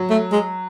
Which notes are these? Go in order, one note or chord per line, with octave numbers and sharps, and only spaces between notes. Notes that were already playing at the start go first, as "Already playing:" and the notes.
Already playing: F#3
A3
G#3